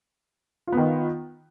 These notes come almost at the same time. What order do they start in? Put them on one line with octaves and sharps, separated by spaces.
F4 B3 D#3